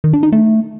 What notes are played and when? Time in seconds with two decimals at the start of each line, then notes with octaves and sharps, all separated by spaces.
0.04 D#3
0.13 D4
0.23 D#4
0.32 A3